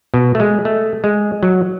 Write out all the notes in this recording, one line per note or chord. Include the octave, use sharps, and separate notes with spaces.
B2
A3
G#3
A3
G#3
F#3